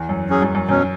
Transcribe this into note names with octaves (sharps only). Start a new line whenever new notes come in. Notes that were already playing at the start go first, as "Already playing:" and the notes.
Already playing: E2
F#2
F#3 C#4 G#4
F#2
F#2
F#2 B2 F#3 C#4